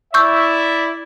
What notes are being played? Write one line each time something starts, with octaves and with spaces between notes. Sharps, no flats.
E4 D5 E5 C#6 E6 G6